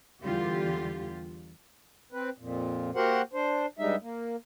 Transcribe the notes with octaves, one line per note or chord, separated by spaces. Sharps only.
E2 D3 E3 G3 F4 G4
C4 B4
F2 A#2
A#3 F#4 G4 A#4 C5 F#5
D4 C5
G2 G3 G#3 D#4 E5
A#3